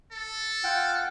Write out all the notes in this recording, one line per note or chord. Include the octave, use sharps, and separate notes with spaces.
A4
F4 F#5 G5